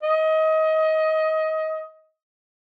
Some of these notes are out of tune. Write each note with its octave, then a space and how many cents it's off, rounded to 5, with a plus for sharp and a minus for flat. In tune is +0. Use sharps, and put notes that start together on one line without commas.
D#5 +25